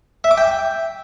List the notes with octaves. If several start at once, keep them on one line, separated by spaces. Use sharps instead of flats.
E5
D6
G5